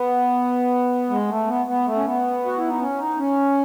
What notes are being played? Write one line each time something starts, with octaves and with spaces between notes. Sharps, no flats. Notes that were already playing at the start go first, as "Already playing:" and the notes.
Already playing: B3
G#3
A3
B3
B3
A3
C#4
B3
F#4
E4
D#4
C#4
D#4
C#4